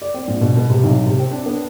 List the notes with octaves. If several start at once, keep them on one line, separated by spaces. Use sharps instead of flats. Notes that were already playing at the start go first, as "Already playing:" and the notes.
D5
C4
A#1
B2
B2
C3
B1
C3
C4
D4
B3